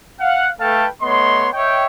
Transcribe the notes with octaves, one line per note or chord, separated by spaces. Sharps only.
F5 F#5
A3 A4 B4 F5 G5 A5
A3 B3 C#5 D#5 C6
C#5 D#5 E5 G5